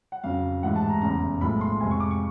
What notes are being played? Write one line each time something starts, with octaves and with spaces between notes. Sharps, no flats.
F#5
F2 C#3 F#3 F5
A1 G#2 E3 G#3 F#5
A5
A#5
F1 E2 C#3 A#5
B1 A2 F3 G#3 B5
C6
F2 C3 F3 G#3 G#5
C#6
D6
C#6